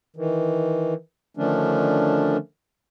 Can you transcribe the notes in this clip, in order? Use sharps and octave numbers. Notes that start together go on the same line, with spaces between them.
D#3 E3
D3 D#3 F3 A3 C#4 D4